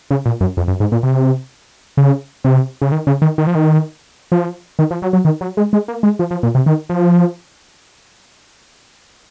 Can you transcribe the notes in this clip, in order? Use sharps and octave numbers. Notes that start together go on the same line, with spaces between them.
C#3
A#2
F#2
F2
F#2
G#2
A#2
C3
C#3
C3
C#3
D#3
C#3
D#3
D#3
F3
D#3
F3
D#3
F3
F#3
F#3
D#3
F#3
G#3
G#3
A#3
G#3
F3
F3
A#2
C3
D#3
F3